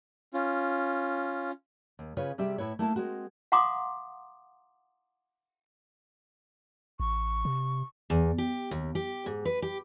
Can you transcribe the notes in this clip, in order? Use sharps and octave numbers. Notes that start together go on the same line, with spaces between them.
C#4 F4
D#2
C#3 C#4 F4 B4 C#5
C3 G3 G4 G#4 E5
A2 E4 B4 C#5
A3 A#3 E4 A4 G#5 A5
G#3 A#3 C4 F#4 A#4
F5 F#5 A#5 C6 D6 D#6
A1 C#6
C3
E2
G4
D#2
G4
G#2
B4
G4